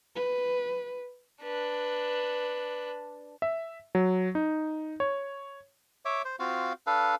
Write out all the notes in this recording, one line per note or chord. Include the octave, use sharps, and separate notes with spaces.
B4
D4 B4
E5
F#3
D#4
C#5
C#5 E5 D6
C5
C4 F4 F#4 F5
D4 A4 B4 F5